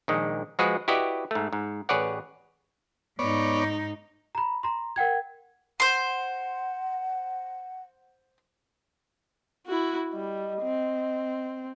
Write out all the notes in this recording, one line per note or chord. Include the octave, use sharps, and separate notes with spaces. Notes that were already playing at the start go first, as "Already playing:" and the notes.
A#1 D#3 G#3
F3 G#3 F#4 G#4 B4
E4 F#4 G4 B4 D5 D#5
G#2 A3
G#2
A1 G#4 B4 C#5 D5 F#5
G#2 B3 D#4 C#5 D5
A#5 B5
A#5 C6
A#4 F#5 G5 G#6
C5 F#5 C6
E4 F#4
G3 D#5
C4